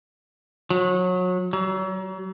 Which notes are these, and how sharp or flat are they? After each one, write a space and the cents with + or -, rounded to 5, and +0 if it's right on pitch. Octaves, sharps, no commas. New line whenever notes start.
F#3 -30
F#3 +40